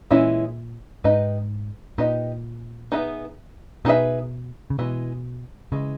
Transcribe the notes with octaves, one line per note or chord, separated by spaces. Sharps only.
A#2 E3 G#3 C#4 E4
G#2 D#4 G4 B4 D#5
A#2 D#4 G4 B4 D#5
B3 D#4 G#4 B4 E5
B2 B3 D#4 G#4 B4 E5
C#3
B2 E3 G#3
C#3 E3 G#3